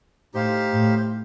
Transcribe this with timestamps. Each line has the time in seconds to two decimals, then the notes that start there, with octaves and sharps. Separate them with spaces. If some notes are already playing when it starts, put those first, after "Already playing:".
0.34 A2 D#4 G4 C5 F5
0.72 A2